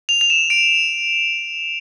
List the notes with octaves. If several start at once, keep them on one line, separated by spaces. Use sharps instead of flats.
F7
F7
E7
D7